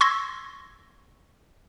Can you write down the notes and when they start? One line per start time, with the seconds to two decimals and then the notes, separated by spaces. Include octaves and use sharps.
0.01 C6 C#6 E6 G#6 A#6